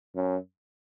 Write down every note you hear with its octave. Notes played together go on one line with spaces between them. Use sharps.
F#2